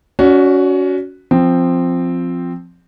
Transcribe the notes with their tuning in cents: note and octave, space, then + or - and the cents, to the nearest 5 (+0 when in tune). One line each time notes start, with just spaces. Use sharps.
C#4 +25 F#4 +0 D5 +0
F3 +0 C4 +0